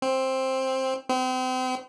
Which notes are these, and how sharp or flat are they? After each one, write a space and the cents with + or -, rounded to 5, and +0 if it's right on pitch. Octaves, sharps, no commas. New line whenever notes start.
C4 +10
C4 -35